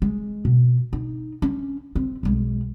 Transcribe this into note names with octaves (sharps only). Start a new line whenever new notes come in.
G#3
B2
D#4
C#4
C4
B1 G#3